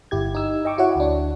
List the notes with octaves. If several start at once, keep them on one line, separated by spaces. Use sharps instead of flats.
G1 E4 G4 G#6
D#4 E6
D#5 G5 C#6 D6
E4 F#4 C#5 F#5
D2 D4